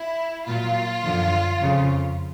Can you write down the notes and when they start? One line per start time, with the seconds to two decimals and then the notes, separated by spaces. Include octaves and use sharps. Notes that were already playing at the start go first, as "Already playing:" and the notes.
Already playing: E4
0.46 A#2 F#3 F4
1.03 F#2 D3 F3
1.60 F2 C#3 F3